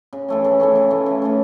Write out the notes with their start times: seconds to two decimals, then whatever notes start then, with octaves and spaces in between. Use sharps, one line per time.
0.13 C#3
0.29 E3 A3 C#4
0.44 C#3
0.60 E3 A3 C#4
0.75 C#3
0.90 E3 A3 C#4
1.06 C#3
1.22 E3 A3 C#4